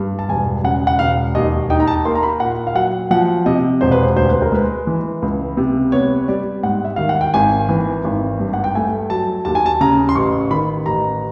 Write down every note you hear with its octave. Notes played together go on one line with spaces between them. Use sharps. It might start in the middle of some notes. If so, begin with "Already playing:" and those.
Already playing: G2
A5
E1 G#5
C#3 F#5
F#5
E1 F5
D#2 D#5
D#4 G5
A#5
A5
A#3 C6
A#5
B5
A#2 F#5
F5
F#3 F#5
F3 F#5
C3 D#5
E1 C5
B4
C5
D2 C5
B4
A#4
G#3 B4
E3
C#2
C3
B3 C#5
G3 D5
G#2 F#5
E5
D#3 F5
F#5
G5
G#1 G#5
E3
G#1
G2
F#5
G5
A3 G#5
F#3 A5
D#2 A5
G#5
A5
C#3 A#5
C6
A1 C#6
D#3 B5
A1 A#5